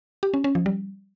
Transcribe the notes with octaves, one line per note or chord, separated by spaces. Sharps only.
G4
C#4
C#4
F3
G3